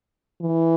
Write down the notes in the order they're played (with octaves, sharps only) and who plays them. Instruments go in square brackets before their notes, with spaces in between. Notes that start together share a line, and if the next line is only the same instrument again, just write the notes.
[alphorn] E3